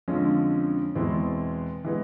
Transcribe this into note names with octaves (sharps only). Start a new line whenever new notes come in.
F2 D3 F3 G#3 C#4
E2 B2 G#3 C4 E4
E3 G#3 B3